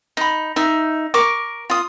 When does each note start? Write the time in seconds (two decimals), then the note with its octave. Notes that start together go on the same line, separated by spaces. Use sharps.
0.17 D#4 B5
0.56 D#4 E5
1.14 A#4 C#6 D6
1.70 F4 D#6